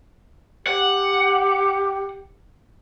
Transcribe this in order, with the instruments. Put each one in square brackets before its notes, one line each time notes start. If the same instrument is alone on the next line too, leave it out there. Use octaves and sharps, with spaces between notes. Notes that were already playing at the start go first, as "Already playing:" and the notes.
[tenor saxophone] G4 [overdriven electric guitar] F#5